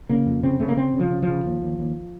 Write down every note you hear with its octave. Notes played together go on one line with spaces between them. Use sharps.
C#3 A#3
F2
C#3 C4
C#3 A3
A#3
C#3 C4
C#3
F3
C#3
F3
C#3
D#2
D#2
D#2